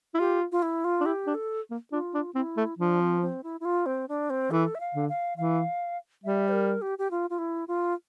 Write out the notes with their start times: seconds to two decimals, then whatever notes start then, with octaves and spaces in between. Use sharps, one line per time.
0.15 E4
0.19 F4 G4
0.52 F4
0.62 E4
0.84 F4
1.01 D4
1.05 E4 G4
1.27 D4
1.34 A4
1.71 A#3
1.92 D4 F4
2.14 D4
2.35 C4 E4
2.57 A3
2.79 F3 D4
3.00 C4
3.22 C4
3.43 E4
3.60 E4
3.65 F4
3.86 C4
4.09 D4
4.30 C4
4.51 E3 A4
4.75 E5
4.80 F5
4.95 D3
5.09 F5
5.37 E3 F5
6.24 G3 E5
6.48 C5
6.52 A#4
6.81 G4
6.98 G4
7.11 F4
7.30 F4
7.38 E4
7.68 F4